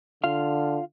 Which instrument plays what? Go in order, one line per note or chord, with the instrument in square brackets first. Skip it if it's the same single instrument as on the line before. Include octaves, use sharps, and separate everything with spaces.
[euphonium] D3 [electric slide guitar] F4 F5